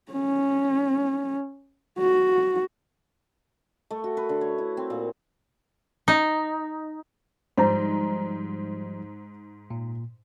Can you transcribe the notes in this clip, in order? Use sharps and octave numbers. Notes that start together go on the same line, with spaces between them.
C#4
F#4
A3
F#4
B4
D3
C#5
E4
C4
A#2
D#4
G#2 F3 G3 D#4 C5 A#5
A#2